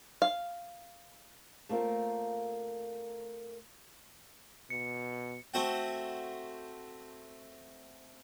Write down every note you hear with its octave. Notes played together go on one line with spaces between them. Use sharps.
F5
A3 A#3 C4 F4 A#4
B2 C#7
A3 C4 F#4 F#5 G5